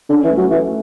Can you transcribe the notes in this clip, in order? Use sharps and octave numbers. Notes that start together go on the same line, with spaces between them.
D3 C#4
E3
A3
F#3
E3 A3